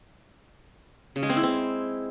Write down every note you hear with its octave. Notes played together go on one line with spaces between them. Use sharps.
C#3
G#3
C4
E4
C4